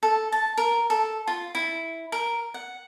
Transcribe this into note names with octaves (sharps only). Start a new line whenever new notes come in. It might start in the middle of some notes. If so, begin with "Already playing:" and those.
A4
A5
A#4
A4
F4
E4
A#4
F#5